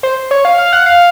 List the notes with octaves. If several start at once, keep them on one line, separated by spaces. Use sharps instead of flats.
C5
C#5
F5
F5
F#5
F5